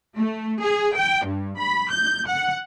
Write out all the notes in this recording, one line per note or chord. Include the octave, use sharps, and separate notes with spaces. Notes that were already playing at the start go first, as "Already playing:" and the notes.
A3
G#4
G5
G2
B5
G6
F#5